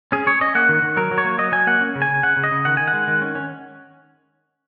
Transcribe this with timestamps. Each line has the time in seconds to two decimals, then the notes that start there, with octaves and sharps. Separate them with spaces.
0.12 C#4 G#4
0.26 C#4 C#5
0.41 C#4 D#5
0.55 A#3 F#5
0.69 D#3
0.82 D#3
0.97 F#3 A#4
1.11 F#3
1.18 C#5
1.25 A#3
1.38 F#3 D#5
1.52 F#3 G#5
1.67 A#3 F#5
1.81 C#4
1.95 C#3
2.02 G#5
2.09 C#3
2.23 C#3 F#5
2.37 C#3
2.44 D#5
2.52 C#3
2.65 D#3 F#5
2.77 D#3 G#5
2.88 F#5
2.93 G#3
3.08 D#3
3.22 C#4
3.35 C#4